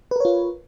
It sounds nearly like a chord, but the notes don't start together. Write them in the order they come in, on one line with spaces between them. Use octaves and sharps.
B4 A#4 C#5 F4